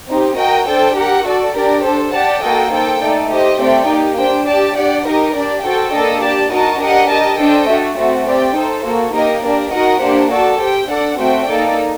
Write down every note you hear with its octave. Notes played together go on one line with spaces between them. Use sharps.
C4 D#4 G4
F#4 A#4 D#5 G5
D4 A4 C5 G5
G4 A#4 F#5
F#4 A4 D5
D4 G4 A#4 D5
D4 A4 C5
G4 D5 F#5 A5
A#3 F#4 A4 D#5 G5
D#4 A4 C5 G5
A3 D#4 A4 D5
G4 C5 D#5
A3 C4 G4 D5 G5
A#3 D#4 G4
D4 G4 C5 G5
G4 D5 A5
D4 G4 D5 F#5
D#4 G4 A#4 D#5
D4 G4 D5
F#4 A4 C5 G5
A#3 D4 A4 D#5
G4 D5 A5
D#4 F#4 A#4 D#5 A5
D4 G4 A#4 D#5 F#5
G4 A#4 D#5 A5
D4 A4 C5 D#5 G5
A3 D4 F#4
A3 C4 F#4
C4 G4 D5 G5
D#4 A4 C5
A#3 F#4 A4
A#3 D#4 G4 A#4 D#5
D4 G4 A#4 D5
D#4 F#4 A#4 D#5 F#5
A#3 D4 G4 C5 F#5
F#4 A4 D5 A5
G4 C5 G5
D4 A4 D5 F#5
A3 C4 F#4 C5 G5
A#3 D#4 A4 D5